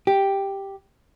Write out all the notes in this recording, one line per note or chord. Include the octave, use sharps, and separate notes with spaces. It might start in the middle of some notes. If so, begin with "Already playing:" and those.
G4